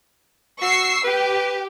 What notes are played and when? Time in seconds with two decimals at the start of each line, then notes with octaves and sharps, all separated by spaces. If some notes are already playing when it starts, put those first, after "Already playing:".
0.62 F#4 C#6 E6 C7
1.04 G4 B4